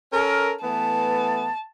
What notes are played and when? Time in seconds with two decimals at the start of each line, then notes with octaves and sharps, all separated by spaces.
0.13 C#4 A4 A#4
0.63 E3 A3 B3 A5